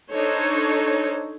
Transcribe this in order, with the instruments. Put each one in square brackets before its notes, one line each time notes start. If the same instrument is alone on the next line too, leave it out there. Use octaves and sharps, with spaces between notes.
[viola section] D4 D#4 A4 C5 C#5